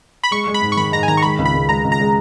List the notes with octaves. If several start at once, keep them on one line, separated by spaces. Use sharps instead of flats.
B5
G#3 C#6
G#3
B5
G#2
C#6
D#3 B5
G#2 A#5
G#5
D#3 A#5
C#6
G#3 B5
C#2
B5
C#2
G#3 A#5
C#2
A#5
G#3